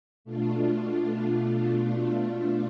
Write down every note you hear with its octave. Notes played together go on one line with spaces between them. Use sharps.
B2 A3 D4 F4